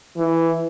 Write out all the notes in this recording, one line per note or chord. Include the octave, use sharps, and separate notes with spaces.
E3